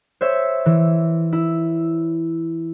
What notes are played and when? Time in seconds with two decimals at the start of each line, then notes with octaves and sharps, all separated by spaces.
0.21 C5 C#5 E5
0.66 E3
1.33 E4